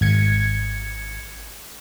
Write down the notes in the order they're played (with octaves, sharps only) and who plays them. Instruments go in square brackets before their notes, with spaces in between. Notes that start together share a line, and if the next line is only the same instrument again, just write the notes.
[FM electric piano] G#1 G#6 C#7